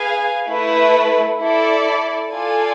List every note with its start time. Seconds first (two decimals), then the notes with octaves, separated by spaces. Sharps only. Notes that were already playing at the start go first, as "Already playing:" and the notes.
Already playing: G#4 B4 F5 G#5
0.49 A3 E4 B4
1.39 E4 A4 D5
2.30 F4 A4 D5 G#5